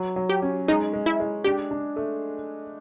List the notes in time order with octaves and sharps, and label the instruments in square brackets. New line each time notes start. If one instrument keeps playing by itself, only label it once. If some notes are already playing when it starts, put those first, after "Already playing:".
Already playing: [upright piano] F#3
F#3
[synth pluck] G4
[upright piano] C#4
[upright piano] G#3 [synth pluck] D#4
[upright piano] G#3
[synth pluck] E4
[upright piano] G#3
[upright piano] D4 [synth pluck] G4
[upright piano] D4
A3